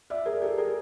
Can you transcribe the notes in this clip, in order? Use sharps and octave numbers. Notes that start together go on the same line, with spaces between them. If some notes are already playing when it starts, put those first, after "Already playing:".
D5 E5
G#4 A#4
G4 A4
G#4 A#4